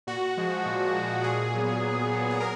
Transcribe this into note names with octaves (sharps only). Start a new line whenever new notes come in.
A#2 F#4
F3 G#3
A#2
F3 G#3
A#2 G#4
F#3 B3
A#2
F#3 B3
G#4
A#4